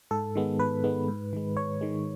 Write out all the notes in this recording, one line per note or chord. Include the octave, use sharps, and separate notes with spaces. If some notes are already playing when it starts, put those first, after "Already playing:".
G#2 A4
D#3 G#3 B3
G#2 B4
D#3 G#3 B3
G#2
D#3 G#3
G#2 C#5
D#3 G#3